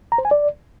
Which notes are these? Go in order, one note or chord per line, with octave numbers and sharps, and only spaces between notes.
A#5
C5
G#5
D5